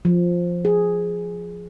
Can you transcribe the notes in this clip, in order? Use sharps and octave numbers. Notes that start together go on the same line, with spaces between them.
F3
G#4